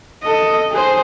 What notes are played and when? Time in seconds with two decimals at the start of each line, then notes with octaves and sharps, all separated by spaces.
0.23 A4 D#5
0.71 G#4 C5